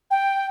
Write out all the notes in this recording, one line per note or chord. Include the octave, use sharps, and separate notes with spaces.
G5